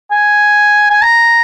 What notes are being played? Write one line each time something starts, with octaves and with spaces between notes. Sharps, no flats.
G#5
G#5
A#5